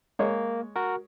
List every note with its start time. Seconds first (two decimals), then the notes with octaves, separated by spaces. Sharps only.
0.19 G#3 A#3 C#5
0.76 F#4 A#4